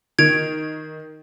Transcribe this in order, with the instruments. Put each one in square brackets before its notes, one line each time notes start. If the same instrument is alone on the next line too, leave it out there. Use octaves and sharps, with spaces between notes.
[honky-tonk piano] D#3 [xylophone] G#6 D7 F7